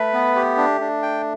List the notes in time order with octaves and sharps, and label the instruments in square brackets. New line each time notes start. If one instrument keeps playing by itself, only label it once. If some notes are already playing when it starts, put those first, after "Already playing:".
Already playing: [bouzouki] A3 [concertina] B4
[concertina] B3
G4
D4
D4
G5